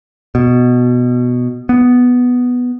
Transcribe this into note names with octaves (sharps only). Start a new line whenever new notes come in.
B2
B3